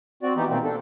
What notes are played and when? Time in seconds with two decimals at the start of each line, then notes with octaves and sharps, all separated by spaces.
0.23 C4 F#4 D5
0.36 E3 B3 D#4 G4
0.49 B2 D#3 A#3 C4
0.64 D4 A4